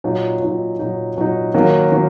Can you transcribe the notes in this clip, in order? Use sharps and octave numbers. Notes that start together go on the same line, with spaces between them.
A#2 F#3 D#4
A#2 F#3 D#4
A#2 F#3 D#4
A#2 F#3 D#4
D#3 F#3 A#3
D#3 F#3